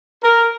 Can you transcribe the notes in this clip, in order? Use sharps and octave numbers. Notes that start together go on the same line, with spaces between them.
A#4